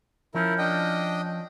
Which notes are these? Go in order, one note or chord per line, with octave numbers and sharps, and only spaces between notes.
F3 C#4 E4 A#4
D4 D#5 G5